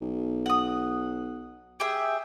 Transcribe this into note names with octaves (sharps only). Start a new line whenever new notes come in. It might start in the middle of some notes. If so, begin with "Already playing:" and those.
B1
F#5 D#6
G4 G#4 E5